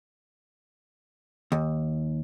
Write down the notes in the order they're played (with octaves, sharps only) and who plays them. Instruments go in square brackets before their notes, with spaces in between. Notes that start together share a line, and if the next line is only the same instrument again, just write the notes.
[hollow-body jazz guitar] D#2